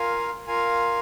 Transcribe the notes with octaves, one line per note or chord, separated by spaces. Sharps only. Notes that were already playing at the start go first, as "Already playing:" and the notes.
Already playing: F4 A#4 F5 G#5
F4 A#4 F5 G#5